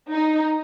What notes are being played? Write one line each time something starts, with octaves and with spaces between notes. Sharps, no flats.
D#4